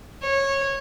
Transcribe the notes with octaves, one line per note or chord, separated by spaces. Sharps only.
C#5